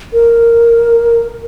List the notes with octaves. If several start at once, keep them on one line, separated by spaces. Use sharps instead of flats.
A#4